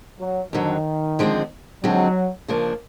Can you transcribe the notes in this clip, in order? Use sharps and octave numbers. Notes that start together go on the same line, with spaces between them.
F#3
F2 D3 D#3 F#3
D3 F3 G#3 C4
D3 F3 F#3 G#3 C4
C#3 F3 A#3 D4